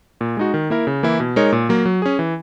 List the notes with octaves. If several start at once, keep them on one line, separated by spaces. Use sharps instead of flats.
A#2
G#3 D#4 F#4
D#3
A#3 E4 A#4
C#3
E3 A#3 E4
B2
G#3 D#4 A#4 C#5
A#2
F#3 A#3
F#3
C#4 G#4
E3